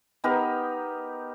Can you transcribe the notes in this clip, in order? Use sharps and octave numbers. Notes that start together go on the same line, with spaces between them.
B3 D#4 G4 A#4